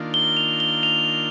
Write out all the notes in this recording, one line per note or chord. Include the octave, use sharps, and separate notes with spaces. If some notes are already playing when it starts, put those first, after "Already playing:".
Already playing: D#3 A#3 D4 F4
G7
F7
G7
F7